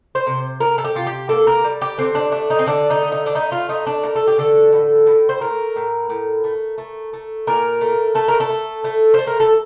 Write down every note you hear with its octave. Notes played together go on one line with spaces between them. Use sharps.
C5
C3
C3 A#4
A4
G4
C3 F4
G4
A#3 A4
A#4
G3
G4
D3 C4
D4
A3 D4
D#4
C4
D3 D4
D#4
A3
D#4
D4
A3 D#4
F4
A3 D#4
D4
A3 A#4
A4
G4
D3 A4
A2
A2
C5
A3 A#4
A2
A2
A3
A3
A3
A#2 A#4
A3
A3 A4
A#4
A4
A3
A3
A3 C5
A#4
A4